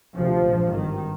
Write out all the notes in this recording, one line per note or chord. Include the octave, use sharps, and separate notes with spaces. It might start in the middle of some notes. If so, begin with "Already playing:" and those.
D2 C3 F3
A#1 G#2
G#1 G2 D#3